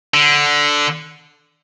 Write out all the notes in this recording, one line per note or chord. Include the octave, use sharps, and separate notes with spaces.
D3